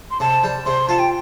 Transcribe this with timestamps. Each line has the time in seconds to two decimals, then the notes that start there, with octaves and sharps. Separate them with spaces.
0.11 C6
0.20 C3 A5
0.44 G3
0.66 C3 C6
0.89 F4 A5
0.99 G5